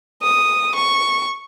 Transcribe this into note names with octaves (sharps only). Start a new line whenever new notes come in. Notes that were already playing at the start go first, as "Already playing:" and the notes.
D#6
C#6